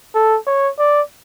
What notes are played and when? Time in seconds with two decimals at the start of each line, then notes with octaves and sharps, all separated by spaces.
0.15 A4
0.47 C#5
0.79 D5